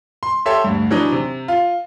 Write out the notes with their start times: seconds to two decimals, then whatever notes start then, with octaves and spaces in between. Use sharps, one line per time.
0.23 C6
0.46 G4 A4 C#5 E5 C6
0.64 D2 G2
0.91 E3 F#3 D4 D#4
1.12 C3
1.48 F4